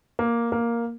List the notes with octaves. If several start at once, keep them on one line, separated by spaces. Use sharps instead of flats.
A#3
A#3